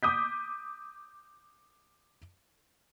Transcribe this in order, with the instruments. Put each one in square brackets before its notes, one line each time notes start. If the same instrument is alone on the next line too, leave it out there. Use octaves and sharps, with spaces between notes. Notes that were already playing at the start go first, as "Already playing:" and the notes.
[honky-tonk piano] D6 D#6 G6 B6